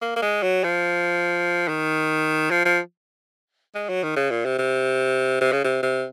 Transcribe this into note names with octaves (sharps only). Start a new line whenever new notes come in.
A#3
A#3
G#3
F#3
F3
D#3
F3
F3
G#3
F#3
D#3
C#3
A#2
C3
C3
C3
C#3
C3
C3